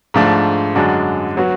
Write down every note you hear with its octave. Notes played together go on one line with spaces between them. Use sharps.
G#2 F3 A3 D4
F#2 D3 G#3 D4 F#4
F#3 B3 F#4